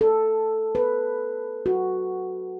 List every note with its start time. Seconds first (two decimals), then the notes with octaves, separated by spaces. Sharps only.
0.01 A4
0.75 B4
1.66 F#4